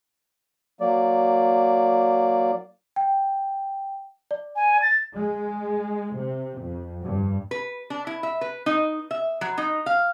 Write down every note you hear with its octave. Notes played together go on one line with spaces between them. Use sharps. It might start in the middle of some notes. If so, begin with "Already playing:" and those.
F#3 A#3 D5
G5
D5
G#5
A6
G#3
C3
F2
G2
B4
D4
E4
E5
B4
D#4
E5
F#3
D#4
F5